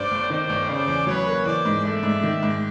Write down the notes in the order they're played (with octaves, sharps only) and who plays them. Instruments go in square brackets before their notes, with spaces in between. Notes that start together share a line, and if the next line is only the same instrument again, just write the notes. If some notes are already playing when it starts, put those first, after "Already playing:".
Already playing: [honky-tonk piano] G2 [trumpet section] C5 D5
[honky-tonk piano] G1
[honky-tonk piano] D#3 [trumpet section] C5 D5
[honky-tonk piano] G1
[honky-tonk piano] C#3 [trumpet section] C5 D5
[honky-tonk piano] E2
[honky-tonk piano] F#3 [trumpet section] B4 C#5
[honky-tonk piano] A#3
[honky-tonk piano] E3 [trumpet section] C5 D5
[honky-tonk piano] G#2
[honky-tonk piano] A3 [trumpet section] D5 E5
[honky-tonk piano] G#2
D#3
G#2